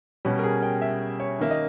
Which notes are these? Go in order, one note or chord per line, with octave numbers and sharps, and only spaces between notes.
B2 G3 C#4
A#4
G#4
G5
E5
C#5
D#3 A#3 C#4 E5
D#5